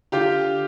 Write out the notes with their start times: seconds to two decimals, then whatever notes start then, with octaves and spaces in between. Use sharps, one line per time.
0.12 D3 F4 G4